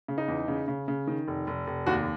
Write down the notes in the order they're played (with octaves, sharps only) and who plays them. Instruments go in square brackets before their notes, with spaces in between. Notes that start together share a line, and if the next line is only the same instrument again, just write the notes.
[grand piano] C#3
D#4
E2
C#3
C#3
C#3
D#3
F1
F1
F1
D#2 F#4